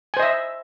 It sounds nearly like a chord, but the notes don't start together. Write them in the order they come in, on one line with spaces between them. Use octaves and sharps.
G#5 C5 D#5 E5